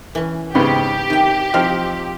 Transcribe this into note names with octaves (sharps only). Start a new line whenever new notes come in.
E3 C#4
G#2 C#3 B3 G4 C6
C3 D#3 G5
F3 C4 D#4 F6